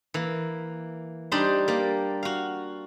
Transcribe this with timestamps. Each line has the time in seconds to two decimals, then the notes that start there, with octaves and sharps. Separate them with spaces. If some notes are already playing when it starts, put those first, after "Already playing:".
0.14 E3 A#3
1.32 G3 D4 D#4 C5
1.68 A#3 G4 D5
2.23 F#4 F5